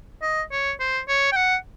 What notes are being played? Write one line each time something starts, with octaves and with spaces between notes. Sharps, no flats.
D#5
C#5
C5
C#5
G5
F#5